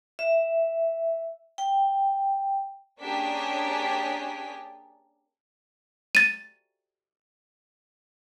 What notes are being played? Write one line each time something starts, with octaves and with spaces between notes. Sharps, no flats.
E5
G5
A#3 C#4 D4 G4 G#4 B6
A6 D#7